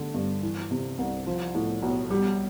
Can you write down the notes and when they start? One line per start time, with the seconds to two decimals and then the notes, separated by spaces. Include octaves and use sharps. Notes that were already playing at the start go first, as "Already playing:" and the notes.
Already playing: D3 A3
0.14 G2
0.42 E3
0.71 C3
0.98 C2
1.27 F3
1.55 A2
1.82 B1
2.10 G3